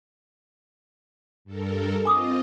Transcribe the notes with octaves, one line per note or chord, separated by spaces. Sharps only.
G2 A4 A#4
C4 F4 D#5 G#5 D6 D#6